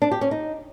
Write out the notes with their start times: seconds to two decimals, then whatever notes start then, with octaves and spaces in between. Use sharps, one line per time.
0.02 D4
0.11 G4
0.21 C#4
0.31 D#4